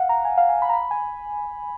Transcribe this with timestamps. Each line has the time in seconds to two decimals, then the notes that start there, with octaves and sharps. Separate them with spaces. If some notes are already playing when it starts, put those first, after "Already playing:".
Already playing: F5 F#5
0.09 A#5
0.25 G#5
0.38 F5
0.49 G#5
0.62 B5
0.69 A#5
0.73 B5
0.91 G#5